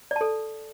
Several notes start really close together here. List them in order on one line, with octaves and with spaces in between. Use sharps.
D5 A5 A4